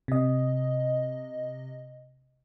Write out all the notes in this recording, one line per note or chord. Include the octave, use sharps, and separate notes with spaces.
C3 D#5